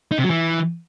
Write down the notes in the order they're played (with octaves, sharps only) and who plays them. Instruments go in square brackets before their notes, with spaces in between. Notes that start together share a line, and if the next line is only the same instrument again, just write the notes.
[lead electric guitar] D#4
C3
F#3
E3